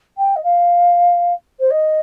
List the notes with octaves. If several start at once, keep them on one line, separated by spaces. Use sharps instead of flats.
G5
D#5
F5
C5
D#5